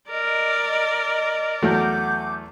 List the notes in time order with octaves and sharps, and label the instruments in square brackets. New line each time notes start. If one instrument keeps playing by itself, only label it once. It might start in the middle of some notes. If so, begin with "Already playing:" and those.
[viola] A#4 D5 [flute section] D#5
[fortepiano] E2 F#3 A3 [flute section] F#5 D6 G6